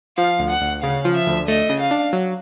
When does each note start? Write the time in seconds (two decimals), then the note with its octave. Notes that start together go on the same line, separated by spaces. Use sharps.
0.17 F3 F5
0.39 D2
0.50 F#5
0.61 D2
0.82 C#3 F5
1.05 F3
1.15 E5
1.27 D2
1.48 A3 D#5
1.69 C#3
1.80 F5
1.91 D4
2.13 F#3